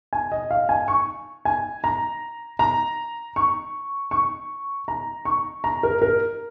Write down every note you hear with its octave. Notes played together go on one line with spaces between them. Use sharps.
G#5
D#5
F5
G#5
C#6
G#5
A#5
A#5
C#6
C#6
A#5
C#6
A#5
A#4
A#4